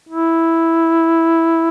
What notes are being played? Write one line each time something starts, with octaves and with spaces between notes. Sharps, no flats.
E4